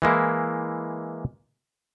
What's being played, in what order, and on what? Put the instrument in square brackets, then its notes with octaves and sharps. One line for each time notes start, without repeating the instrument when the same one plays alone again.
[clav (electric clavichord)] E3 G#3 A#3 E4